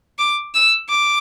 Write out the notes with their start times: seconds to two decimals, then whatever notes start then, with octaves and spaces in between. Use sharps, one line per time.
0.18 D6
0.54 E6
0.89 D6